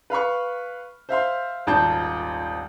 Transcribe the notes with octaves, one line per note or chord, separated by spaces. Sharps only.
B4 F5 B5 C#6
C5 E5 F5 C6
D#1 G#1 F4 A5 G6